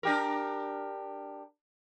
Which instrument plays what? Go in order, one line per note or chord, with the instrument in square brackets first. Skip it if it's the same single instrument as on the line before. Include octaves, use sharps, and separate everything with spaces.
[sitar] D4 G4 A#4